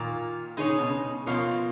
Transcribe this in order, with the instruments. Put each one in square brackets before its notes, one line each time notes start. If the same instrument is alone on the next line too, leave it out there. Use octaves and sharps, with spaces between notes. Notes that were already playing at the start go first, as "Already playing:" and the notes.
Already playing: [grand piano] A#2 [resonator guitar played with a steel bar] D#3 A#3 F4
[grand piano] D#3 [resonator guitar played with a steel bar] G#3 D#4 G#4 C#5
[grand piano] C#3
B2
C#3
[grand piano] B2 [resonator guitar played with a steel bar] F3 A#3 F4 A#4 C#5